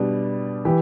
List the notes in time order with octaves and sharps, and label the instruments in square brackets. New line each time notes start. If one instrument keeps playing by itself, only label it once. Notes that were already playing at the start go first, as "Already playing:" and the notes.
Already playing: [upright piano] B2 G3 D4
[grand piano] E3 [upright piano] G4